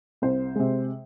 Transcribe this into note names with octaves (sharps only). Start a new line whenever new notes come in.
C2 C5
C3 G#3